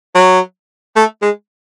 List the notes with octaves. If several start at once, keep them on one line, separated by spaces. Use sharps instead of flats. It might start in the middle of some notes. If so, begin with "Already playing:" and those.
F#3
A3
G#3